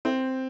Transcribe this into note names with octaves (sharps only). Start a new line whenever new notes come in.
C4